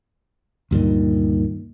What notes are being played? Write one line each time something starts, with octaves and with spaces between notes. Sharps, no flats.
D2 G2 A#2 D#3